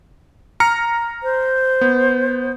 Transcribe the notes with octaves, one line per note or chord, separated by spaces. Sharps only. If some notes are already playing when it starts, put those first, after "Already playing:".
A#5 F6 C#7
C5
B3